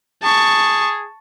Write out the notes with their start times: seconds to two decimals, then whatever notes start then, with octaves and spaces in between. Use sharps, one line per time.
0.23 G#4 A5 C#6